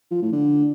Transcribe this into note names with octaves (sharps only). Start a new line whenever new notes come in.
F3
A2
D3